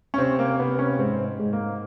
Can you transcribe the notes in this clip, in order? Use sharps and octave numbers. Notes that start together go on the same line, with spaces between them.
C#4
C3 C4
A#3
C3 B3
C#4
G#2 C4
G#2
A#3